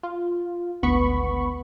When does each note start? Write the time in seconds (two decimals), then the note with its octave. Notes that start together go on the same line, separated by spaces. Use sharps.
0.03 F4
0.83 G#1 D2 B3 B5 C#6